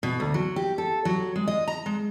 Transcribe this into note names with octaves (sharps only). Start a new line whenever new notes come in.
B2
D2
F#3
G4
A4
F#3
G#3
D#5
A#5
G#3